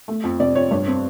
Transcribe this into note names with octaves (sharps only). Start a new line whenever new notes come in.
A3
F2
C3 D5
F2 C#5
G2 C#5
C4